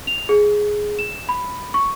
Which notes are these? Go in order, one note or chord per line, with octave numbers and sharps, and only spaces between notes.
F7
G#4
E7
B5
C#6